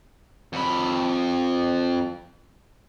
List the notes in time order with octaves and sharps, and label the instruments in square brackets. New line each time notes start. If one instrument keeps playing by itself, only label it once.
[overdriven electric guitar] F2 B5